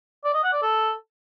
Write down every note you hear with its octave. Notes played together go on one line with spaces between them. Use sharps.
D5
D#5
F#5
D5
A4